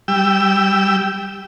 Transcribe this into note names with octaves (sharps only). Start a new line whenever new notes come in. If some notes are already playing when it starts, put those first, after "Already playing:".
G3 G5 E6